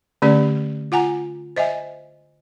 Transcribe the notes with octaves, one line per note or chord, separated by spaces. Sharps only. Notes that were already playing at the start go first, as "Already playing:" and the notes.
D3 A3 C#4 G4 D5
F4 F#5 G#5 A#5
C5 D#5 E5 G#5